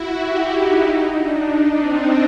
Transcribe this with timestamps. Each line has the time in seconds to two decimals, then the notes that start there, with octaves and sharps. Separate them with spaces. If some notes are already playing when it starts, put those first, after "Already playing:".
Already playing: E4 F#4
0.22 G4
0.54 D#4
0.85 D#4
1.16 D4
1.47 D4
1.79 C4